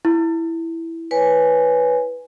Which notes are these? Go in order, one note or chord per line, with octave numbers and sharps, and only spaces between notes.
E4
B4 C#5 G#5